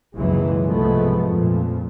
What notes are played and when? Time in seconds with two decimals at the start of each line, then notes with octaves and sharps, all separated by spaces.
0.14 F#1 C#2 B2 E3 F#3 G#3
0.64 C2 G#2 F3 G#3 A3 B3
1.25 F2 A#2